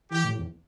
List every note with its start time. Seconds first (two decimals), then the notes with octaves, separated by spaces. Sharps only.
0.11 E3 G4
0.24 A2
0.38 E2